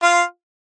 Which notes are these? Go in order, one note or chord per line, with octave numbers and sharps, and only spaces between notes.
F4 F5